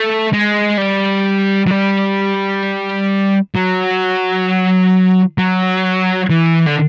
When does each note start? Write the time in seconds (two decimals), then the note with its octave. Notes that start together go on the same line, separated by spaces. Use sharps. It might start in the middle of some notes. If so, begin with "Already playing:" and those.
Already playing: A3
0.33 G#3
0.78 G3
1.67 F#3
1.70 G3
3.55 F#3
5.38 F#3
6.30 E3
6.67 D3